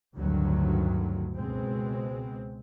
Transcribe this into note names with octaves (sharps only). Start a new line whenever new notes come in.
A1 D2 G2 D3 D#3 F#3
C#2 B2 G#3 C4